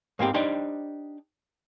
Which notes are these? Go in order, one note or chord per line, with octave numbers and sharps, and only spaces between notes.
G#2 A#3 C4 G4
D4 D#4 G4 C5 G5